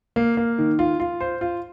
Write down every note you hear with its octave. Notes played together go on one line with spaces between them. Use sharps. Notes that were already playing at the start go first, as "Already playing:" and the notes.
A#3
A#3
D#3
F4
F4
C5
F4